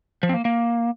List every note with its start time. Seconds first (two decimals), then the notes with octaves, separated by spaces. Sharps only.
0.23 F3
0.29 C4
0.34 A#3
0.45 A#3